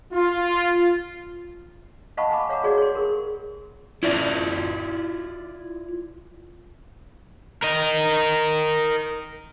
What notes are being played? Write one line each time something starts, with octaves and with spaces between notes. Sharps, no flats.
F4
D#5 F5 F#5 A5 B5 C#6
G#5 B5 D6
C#5 F5 F#5 A#5 D6
F#4 G#4 C#5 D5
C#5 C6
G4 G#4 A#4
E4 F4 D5 E5
A#4 D#5